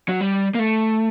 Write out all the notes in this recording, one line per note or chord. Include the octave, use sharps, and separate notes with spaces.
F#3
G3
A#3
A3